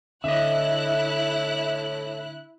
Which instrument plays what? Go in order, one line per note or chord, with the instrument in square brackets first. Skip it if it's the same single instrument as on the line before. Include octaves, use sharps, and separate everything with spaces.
[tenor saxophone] A2 [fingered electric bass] D3 [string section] E4 F#6 [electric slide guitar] D#5 E5